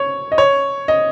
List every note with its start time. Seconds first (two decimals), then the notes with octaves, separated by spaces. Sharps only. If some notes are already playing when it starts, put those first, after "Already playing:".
Already playing: C#5
0.32 D#5
0.38 C#5
0.88 D#5